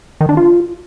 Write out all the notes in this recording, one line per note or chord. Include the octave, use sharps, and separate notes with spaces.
D#3
D4
F4